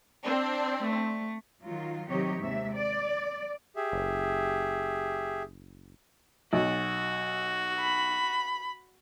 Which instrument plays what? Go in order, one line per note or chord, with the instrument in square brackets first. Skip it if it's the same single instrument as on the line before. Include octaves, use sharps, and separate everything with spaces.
[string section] C4 D4
[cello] A3
[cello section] D#3 F#3 F4
C3 D#3 F#3 D#4 G4 C#5
D#2 G#2 C3 E5
D5
[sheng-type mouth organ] G4 G#4 E5
[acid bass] F#1
[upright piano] B1 [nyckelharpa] F#4
[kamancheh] B5